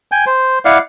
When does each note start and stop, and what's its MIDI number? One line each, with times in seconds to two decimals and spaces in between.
0.12 0.25 79
0.12 0.25 80
0.26 0.59 72
0.65 0.78 64
0.65 0.78 74
0.65 0.78 77
0.65 0.78 78